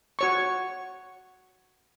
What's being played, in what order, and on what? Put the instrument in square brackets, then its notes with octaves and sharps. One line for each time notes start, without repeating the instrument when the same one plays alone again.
[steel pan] F#4 C#5 C#6